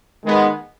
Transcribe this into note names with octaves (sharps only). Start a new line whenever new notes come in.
D#3 G#3 B3